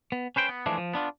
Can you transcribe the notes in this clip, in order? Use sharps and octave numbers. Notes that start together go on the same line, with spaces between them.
B3
C#4 B4 C5 G5
B3
E3 F3 G#3 A3 D4
F3
B3 D4 F4